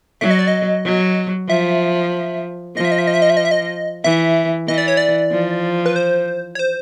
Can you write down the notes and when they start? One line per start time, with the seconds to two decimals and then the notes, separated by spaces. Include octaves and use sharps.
0.21 F#3 E5
0.31 D#5
0.39 D5
0.48 D#5
0.85 F#3
1.49 F3 E5
2.76 F3 D#5
2.85 E5
2.92 D#5
2.99 E5
3.07 D#5
3.14 E5
3.22 D#5
3.30 E5
3.37 D#5
3.45 E5
3.51 D#5
4.04 E3 E5
4.68 E3 D#5
4.78 D5
4.88 C#5
4.97 D5
5.31 F3
5.86 B4
5.96 C5
6.55 C#5
6.59 C5